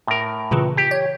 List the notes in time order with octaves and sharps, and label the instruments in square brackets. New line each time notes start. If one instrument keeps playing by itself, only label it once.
[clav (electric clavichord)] A2 A#4
[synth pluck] A#2 C#3 E3
[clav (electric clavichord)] G4
[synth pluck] C#5